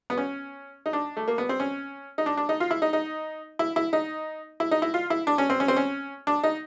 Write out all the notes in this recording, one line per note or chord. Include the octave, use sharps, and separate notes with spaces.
B3
C#4
D#4
D4
A3
A#3
B3
C4
C#4
D#4
D4
D4
D#4
F4
E4
D#4
D#4
E4
E4
D#4
E4
D#4
E4
F4
E4
D4
C#4
C4
C#4
C4
C#4
D4
D#4